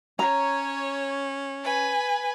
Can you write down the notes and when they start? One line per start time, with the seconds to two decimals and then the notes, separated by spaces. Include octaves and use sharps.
0.19 C#4 C#5 A#5
1.63 B4 G#5